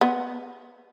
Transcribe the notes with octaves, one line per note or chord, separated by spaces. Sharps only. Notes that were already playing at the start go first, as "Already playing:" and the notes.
B3